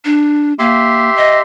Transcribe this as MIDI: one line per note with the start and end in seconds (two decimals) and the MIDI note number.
0.05 0.53 62
0.59 1.10 58
0.59 1.41 67
0.59 1.41 76
0.59 1.41 84
1.16 1.38 75